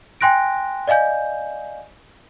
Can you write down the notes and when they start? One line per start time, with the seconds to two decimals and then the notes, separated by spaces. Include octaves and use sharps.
0.21 G5 G#5 C6 F#6 A#6 D7
0.88 D5 D#5 F5 G#5 G6